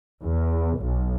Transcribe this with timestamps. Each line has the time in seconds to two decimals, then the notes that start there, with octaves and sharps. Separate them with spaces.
0.22 E2
0.79 B1